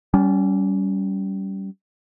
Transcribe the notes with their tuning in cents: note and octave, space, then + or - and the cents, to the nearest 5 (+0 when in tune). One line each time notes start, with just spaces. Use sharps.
G3 -20 C#4 +20